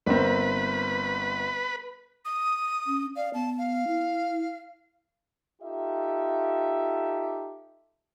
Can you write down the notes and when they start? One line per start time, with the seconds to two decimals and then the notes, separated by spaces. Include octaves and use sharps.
0.06 G1 A#3 C4 B4
2.25 D#6
2.87 C#4
3.16 D5 F5
3.34 B3 A5
3.58 F5
3.87 E4
5.62 D#4 F4 G4 A4 E5